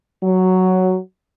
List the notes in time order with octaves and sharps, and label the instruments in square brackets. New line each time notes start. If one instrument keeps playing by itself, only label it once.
[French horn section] F#3